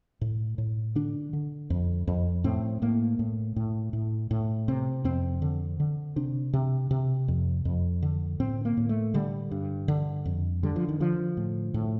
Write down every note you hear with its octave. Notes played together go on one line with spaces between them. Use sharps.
A2
A2
D3 D4
D3
F2
F2
A2 C4
A2 A#3
A2
A2
A2
A2
C3 C4
F2 C4
D3
D3
C3 D4
C3
C3
F2
F2
D3
A2 C4
A#3
A2
A3
D3 G3
G2
D3
F2
D3 G3
F3
D#3
D3 F3
A2
A2